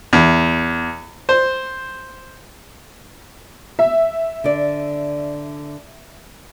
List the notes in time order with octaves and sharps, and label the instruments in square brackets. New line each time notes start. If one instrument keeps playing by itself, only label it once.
[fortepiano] E2
C5
[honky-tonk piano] E5
[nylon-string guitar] D3 D5